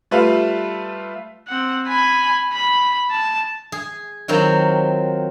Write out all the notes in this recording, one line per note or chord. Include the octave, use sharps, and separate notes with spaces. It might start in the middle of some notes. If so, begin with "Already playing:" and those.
G3 A3 F4 B4 E5 F5
C4 F#5
G#5 B5
B5
A5
G#4
D#3 F#3 C4 F4 F#4